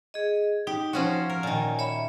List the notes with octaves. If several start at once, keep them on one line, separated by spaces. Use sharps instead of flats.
G#4 D#5
D#4 G4
F3 C#4 F#4
A#4
A#2 D#3 G#5
C#5 E5 B5